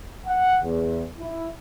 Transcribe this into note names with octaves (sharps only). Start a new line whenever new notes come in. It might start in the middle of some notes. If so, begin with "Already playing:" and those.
F#5
E2
E4